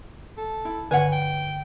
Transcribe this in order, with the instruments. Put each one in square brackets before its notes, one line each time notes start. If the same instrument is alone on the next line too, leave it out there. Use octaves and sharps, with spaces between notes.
[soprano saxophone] A4
[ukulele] E4
[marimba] G2 D3 [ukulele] B4 C#5 F#5 [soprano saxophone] G#5
[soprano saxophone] G5